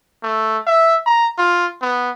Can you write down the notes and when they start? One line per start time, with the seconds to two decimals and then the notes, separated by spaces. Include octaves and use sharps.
0.23 A3
0.67 E5
1.06 A#5
1.38 F4
1.82 B3